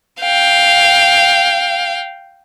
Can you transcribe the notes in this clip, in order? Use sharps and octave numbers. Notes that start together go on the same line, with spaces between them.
F5 G5